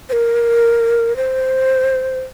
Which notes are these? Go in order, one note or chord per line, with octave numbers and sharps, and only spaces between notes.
C5
A#4
C5